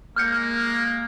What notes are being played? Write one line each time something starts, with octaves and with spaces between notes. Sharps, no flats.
G#3 A#3 F6 G6 C#7